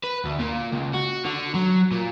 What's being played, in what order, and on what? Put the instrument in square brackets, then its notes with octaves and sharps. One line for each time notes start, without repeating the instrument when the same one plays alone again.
[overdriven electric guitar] B4
D2
A#2
C#2
F#4
D3
F#3
A#2